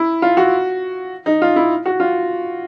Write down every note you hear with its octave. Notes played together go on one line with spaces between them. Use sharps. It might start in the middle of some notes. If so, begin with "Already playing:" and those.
Already playing: E4
F4
F#4
D#4
F4
E4
F#4
F4